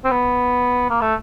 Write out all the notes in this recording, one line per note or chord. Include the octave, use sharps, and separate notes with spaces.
C4
B3
A#3
A3